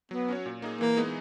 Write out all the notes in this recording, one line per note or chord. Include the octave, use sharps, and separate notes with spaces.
F#3 B3
C#4 F#4 C#5
A#2
A#3 D#4 G#4
E3 A#3
G#3 B3 D#4 G#4